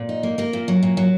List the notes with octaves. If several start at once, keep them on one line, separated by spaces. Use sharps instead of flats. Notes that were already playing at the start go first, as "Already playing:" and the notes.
Already playing: A#2
D#4
A#3
A#3 A#4
A#2
F#3
A#2
F#3